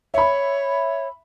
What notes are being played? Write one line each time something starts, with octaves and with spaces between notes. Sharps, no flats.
C#5 E5 B5